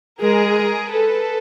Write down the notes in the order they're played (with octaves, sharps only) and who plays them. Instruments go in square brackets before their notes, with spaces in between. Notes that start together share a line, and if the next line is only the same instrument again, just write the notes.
[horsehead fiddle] G#3 [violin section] G#4 A#4
[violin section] A4 B4